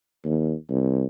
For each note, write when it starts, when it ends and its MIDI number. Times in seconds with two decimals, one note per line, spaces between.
0.25 0.54 39
0.70 1.06 36